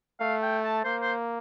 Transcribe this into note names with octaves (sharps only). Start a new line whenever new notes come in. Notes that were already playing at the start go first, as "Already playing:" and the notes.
A3 F5
G5
A5
A#3 C5
C5